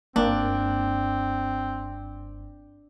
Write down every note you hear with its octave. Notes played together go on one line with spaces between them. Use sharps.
F#1 G2 A#3 C4 D4